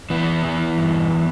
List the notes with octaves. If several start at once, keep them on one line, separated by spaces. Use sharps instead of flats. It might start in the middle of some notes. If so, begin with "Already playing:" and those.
E3 B3
E3
G2